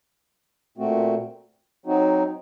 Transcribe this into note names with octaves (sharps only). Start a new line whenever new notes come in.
A#2 A3 C4 F#4
F#3 C4 D#4 F#4